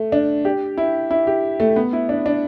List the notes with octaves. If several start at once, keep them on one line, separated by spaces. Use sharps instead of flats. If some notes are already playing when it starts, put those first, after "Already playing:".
Already playing: A3
D4
G4
E4
E4
G4
A3
B3
E4
D4
D4